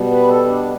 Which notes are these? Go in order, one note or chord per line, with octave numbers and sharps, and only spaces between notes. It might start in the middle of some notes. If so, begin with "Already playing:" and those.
Already playing: B2 G3 B3
B4
A4
D4